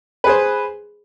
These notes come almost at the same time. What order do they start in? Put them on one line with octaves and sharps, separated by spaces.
B4 G#4 C5